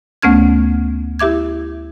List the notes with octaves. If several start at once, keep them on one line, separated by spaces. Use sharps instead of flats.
D2 A3 B3 C#4 F6 G#6
E4 G4 E5 D6 G#6